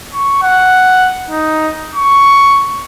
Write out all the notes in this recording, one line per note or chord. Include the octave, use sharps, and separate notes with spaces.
C#6
F#5
D#4
C#6